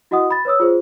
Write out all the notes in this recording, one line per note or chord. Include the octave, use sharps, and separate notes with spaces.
E4 F#4 D#5 F#5 D#6
B5 A6
B4 C#5 D#6 E6
F4 G#4 C5